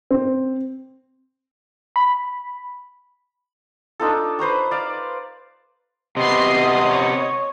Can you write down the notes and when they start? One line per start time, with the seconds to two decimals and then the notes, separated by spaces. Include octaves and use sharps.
0.11 C4
1.96 B5
4.00 D4 D#4 F4 A4
4.39 B4 C5 A#5 C#6
4.71 D5 F5
6.17 C3 B3 D#5 C6 C7
6.86 C#5